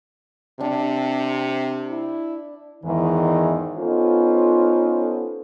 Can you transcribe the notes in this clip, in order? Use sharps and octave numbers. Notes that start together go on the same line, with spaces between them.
C3 D4 G5
E4
E2 G#2 D#3 E3
B3 C#4 D#4 F4 A4 C5